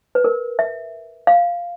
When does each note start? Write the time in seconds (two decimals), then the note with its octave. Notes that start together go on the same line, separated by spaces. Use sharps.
0.15 B4
0.24 A#4
0.59 E5
1.27 F5